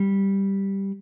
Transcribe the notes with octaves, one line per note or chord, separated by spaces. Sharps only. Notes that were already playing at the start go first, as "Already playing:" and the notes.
Already playing: G3